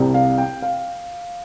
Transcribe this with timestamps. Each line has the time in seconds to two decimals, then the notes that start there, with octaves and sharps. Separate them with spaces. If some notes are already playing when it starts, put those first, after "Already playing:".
Already playing: C2 C3 G3
0.14 F5
0.38 G5
0.62 F5